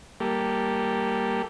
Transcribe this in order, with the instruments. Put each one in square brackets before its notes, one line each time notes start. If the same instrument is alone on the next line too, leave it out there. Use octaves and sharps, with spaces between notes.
[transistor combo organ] G3 A#3 G4 A4